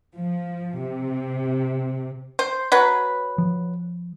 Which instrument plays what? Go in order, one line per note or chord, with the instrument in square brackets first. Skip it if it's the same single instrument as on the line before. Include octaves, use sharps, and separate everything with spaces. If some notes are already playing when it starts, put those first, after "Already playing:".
[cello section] F3
C3
[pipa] C5
F#3 B4
[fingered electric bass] F3